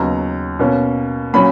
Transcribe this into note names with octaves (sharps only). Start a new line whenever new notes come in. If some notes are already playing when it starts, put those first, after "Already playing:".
Already playing: D#2 C#3 F#3 B3 A#5
B2 A#3 C#4
A#2 F#3 C#4 B5